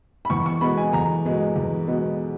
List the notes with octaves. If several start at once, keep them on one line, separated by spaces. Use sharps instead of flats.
B5
E2 C#6
C#6
B2 G#3 B3 B5
G#5
E2 A#5
B2 G#3 B3
E2
B2 G#3 B3